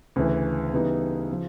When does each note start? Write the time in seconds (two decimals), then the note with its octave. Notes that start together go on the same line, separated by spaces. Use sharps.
0.16 D2 C#3 E3
0.73 C#3 E3 G3 B3 D#4
1.31 C#3 F3